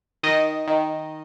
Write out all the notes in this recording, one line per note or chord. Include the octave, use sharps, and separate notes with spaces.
D#3 D#5
D#3